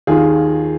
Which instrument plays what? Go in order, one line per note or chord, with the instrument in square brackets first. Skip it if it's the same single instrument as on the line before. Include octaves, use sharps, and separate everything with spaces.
[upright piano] D#2 D#3 F4 G#4